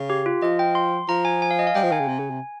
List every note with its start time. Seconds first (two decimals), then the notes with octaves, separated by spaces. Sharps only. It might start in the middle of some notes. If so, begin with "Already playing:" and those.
Already playing: C#3
0.10 G4
0.26 F4
0.42 F3 D#5
0.59 G5
0.75 C6
1.08 F3 A#5
1.25 G#5
1.42 G#5
1.51 F5
1.59 D#5
1.67 F5
1.75 G3 G5
1.83 F3
1.92 D#3 G#5
2.00 C#3
2.08 C3
2.19 C#3
2.30 C3